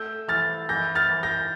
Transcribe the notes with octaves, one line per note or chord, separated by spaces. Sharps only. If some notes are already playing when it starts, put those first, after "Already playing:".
Already playing: A3 E6 G6
E3 F6 A6
E3 G6 A#6
F6 A6
E3
G6 A#6